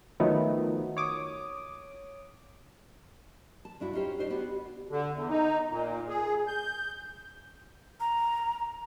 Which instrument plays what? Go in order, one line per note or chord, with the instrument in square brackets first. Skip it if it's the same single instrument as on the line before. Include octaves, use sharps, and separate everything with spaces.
[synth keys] D#3 F3 F#3 A3 B3
C#5 D6 D#6
[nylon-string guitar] A5
G2 D4 E4 F#4
C#4 D#4 F4 G4 C5
D4 D#4 C5 D5
B3 F#4 G4
[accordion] D3
E2
D#4
A#2
G#4
G6
[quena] A#5